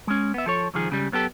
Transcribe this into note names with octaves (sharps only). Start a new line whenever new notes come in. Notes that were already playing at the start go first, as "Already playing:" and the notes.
G#3 C#4
B3 E5
F3 A4 C#5
C2 F2 D#3 F3 G#4
C#2 C#3 G3
F#2 B3 G4 A4